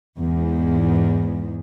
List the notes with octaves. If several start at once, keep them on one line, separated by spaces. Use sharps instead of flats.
E2 G#2